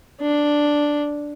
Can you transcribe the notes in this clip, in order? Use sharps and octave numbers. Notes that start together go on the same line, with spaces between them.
D4